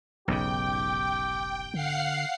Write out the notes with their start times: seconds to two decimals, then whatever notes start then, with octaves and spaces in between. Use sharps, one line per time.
0.28 F1 B1 G#2 C#3 G4 G5
1.74 D3 F5 F#5 C7